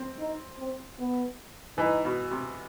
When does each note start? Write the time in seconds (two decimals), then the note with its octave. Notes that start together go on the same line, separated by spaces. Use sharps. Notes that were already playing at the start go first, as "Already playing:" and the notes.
Already playing: C4
0.19 D#4
0.59 C4
0.99 B3
1.78 E3 D#4
2.05 B2
2.31 C3